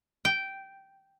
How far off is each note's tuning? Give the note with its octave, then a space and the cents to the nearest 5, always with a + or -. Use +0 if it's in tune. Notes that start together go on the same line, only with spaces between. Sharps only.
G5 -10